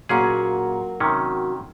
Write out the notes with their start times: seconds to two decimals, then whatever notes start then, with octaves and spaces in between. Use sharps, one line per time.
0.09 A#2 F#3 A#3 C#4 F#4 G#4
1.00 C3 D#3 C#4